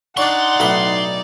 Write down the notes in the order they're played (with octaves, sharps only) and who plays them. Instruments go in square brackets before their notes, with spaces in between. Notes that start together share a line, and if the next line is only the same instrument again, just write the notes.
[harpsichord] D4 C#6 [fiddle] D#4 D5 [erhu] F#5 [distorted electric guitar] C6
[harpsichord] B1 A2 B5